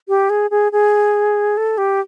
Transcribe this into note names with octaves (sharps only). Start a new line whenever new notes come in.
G4
G#4
G#4
G#4
A4
G4